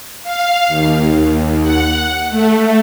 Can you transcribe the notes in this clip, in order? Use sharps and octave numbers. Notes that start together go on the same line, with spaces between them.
F5
D#2
D#2
F#5
A3